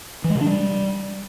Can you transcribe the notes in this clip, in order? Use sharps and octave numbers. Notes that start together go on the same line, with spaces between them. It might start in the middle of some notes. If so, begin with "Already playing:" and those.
E3
G#3
C3
D4
G3